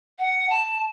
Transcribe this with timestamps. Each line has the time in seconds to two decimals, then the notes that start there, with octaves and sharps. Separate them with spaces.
0.19 F#5
0.50 A5